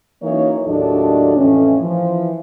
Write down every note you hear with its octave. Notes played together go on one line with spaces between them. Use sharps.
F#2 E3 A#3 D#4 C#5
D#2 A2 F#3 D4 A4 D#5
F2 A2 E3 C#4
E3 F3